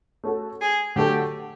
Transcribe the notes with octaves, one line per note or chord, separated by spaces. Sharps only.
A3 C#4 F#4 A4
G#4
D3 F#3 A3 G4